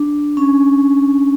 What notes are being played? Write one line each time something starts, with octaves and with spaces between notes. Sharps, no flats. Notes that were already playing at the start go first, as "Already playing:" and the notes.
Already playing: D4
C#4